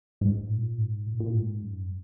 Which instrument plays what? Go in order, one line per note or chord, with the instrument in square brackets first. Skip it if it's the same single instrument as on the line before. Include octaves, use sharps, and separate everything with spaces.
[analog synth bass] G#2
A#2
G#2
A#2
A#2
G#2
F#2